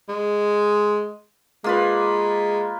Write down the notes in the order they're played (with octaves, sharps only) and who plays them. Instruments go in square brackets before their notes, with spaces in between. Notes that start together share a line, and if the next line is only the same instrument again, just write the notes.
[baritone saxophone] G#3
[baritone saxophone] G#3 [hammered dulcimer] A#3 F4 B4